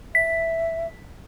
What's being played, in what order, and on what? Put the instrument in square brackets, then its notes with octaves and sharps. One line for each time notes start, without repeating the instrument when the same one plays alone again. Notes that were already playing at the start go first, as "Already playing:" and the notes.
[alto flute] E5 [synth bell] B6